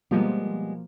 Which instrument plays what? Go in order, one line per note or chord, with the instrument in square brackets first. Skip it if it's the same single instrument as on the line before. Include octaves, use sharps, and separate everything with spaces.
[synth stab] B2 F3 A#3 [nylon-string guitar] G3 G#3 B3